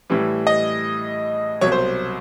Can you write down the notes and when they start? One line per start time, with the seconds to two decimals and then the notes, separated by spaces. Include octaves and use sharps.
0.10 A2 E3 G3
0.47 D#5
1.61 C2 B2 F#3 C#5
1.72 C5